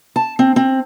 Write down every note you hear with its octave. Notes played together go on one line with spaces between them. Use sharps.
A5
C4
C4